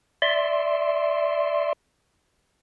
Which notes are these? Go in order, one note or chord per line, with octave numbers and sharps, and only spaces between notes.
D5 E5 C6